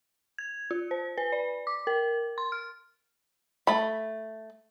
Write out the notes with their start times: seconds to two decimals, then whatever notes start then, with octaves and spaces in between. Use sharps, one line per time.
0.38 G#6
0.71 F4
0.91 C5
1.17 B4
1.32 D5
1.67 D6
1.87 A#4
2.38 C6
2.52 F6
3.67 A3 B5